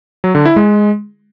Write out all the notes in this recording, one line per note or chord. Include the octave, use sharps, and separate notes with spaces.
F#3
D3
E4
G#3